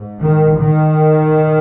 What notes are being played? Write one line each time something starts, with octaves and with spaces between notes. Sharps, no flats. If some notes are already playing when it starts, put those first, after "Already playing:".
Already playing: G#2
D#3
D#3